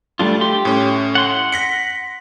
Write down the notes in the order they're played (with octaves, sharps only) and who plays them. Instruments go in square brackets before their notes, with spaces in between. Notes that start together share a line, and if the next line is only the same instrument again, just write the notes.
[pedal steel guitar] G3 D4 F4 [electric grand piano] A3
[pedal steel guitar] G4 C6
[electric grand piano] A2 C#4
[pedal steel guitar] F#5 C6
[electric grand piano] A#6 B6 C#7